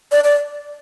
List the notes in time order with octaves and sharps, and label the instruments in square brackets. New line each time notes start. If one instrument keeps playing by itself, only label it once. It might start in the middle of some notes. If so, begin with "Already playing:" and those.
[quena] D5
D5